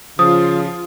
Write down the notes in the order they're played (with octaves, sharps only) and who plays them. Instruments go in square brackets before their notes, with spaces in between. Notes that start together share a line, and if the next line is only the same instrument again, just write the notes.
[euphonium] C#3 [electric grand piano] F3 [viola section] F4 [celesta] D#6